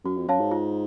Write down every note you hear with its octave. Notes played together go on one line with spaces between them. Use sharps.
F#2 F#4
F2
F#2 C#5 F5 A5
G#2
F4